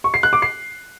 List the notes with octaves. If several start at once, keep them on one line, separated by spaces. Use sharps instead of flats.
C#6
C7
F#6
D6
C7